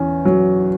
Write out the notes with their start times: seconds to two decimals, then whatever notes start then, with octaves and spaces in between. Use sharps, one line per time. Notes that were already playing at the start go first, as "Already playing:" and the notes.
Already playing: E2 C#4
0.25 F#3